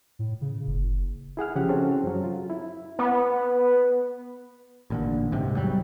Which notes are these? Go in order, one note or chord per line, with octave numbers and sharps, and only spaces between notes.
A2
C#3
F#1
E4 G#4 F#5 F6
C#3 F3 G4 F#5
C4 C#4 F#4 G#4 A4
F#2 F#3
F4
E4
B3
A1 A#2 D3
C2 G#2 C3 D#3
E2 F#3 G3